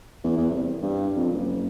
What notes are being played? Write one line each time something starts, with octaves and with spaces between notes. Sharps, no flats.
E2
E2
C2
G2
F2
F#1